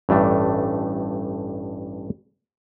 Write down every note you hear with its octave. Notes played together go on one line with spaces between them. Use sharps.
A1 G2 A3 D4